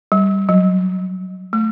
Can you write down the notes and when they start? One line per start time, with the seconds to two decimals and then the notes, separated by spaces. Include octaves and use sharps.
0.12 G3
0.49 F#3
1.53 A3